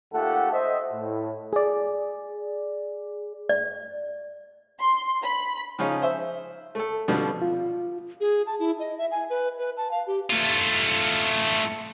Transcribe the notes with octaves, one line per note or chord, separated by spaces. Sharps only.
D#2 A3 F4 G4 A4 F#5
C5 D#5 E5
A2
G#4 D5
D5
C6
B5
C#3 F3 C#4 D#4 F4 G#4
C5 E5
A3 A4
B2 D3 F3 G3 B3 C4
F4
G#4
A5
E4
D#5
E5
G#5
B4
B4
A5
F5
G4
A3 F4